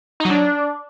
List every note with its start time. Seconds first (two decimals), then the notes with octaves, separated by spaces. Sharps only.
0.20 D#4
0.25 F#3
0.30 D4